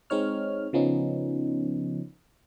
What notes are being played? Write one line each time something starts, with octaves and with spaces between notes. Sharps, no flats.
G#3 C4 D#4 C#5 F6
C#3 F3 B3 C#4 D#4